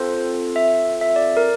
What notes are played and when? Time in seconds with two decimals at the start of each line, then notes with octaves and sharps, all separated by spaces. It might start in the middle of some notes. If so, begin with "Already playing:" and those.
Already playing: C4 F4 A4 C5
0.56 E5
1.01 E5
1.16 D5
1.37 A#4